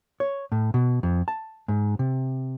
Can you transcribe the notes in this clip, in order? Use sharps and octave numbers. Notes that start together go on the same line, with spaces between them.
C#5
A2
B2
F2
A5
G#2
C3